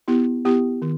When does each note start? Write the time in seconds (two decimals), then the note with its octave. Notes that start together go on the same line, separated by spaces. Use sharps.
0.08 B3 E4 G4
0.45 B3 E4 G4
0.82 D#3